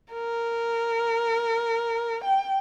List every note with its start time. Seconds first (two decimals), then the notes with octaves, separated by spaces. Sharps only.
0.13 A#4
2.24 G5